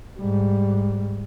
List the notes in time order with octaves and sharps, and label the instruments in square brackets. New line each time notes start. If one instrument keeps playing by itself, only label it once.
[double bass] G#2 G3